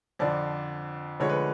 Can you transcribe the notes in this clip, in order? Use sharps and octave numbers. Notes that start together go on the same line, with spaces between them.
F2 D3 F3 D5
D2 D3 F3 G#3 C#5
B4